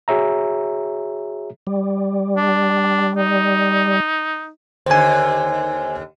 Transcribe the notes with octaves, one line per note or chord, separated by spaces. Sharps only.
F#4 G#4 C#5 E5 A#5
G3
D4
D#4
D#2 D3 C5 G#5